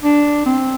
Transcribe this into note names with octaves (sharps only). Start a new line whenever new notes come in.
D4
C4